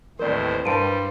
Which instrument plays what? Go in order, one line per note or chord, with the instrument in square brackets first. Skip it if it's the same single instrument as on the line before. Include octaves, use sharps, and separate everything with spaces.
[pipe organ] D#2 A2 C5 [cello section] E3 C4 [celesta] A#4 D5
[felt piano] G2 A#4 A5 [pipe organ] G3 [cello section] C5 [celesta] C6 D7 D#7